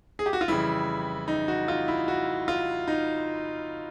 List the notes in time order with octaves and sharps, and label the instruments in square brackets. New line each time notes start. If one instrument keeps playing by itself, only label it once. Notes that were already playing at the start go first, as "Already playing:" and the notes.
[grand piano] G#4
G4
F#4
F4
F2 C#3 E3 G3 E4
D#4
F#4
F4
E4
F#4
F4
D#4